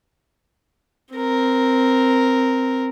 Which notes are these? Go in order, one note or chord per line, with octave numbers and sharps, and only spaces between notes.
C4 A#4